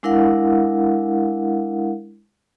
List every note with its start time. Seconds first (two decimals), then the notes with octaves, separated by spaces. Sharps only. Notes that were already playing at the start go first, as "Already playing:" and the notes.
0.03 G#3 D4 E4 A#4 F5 F#5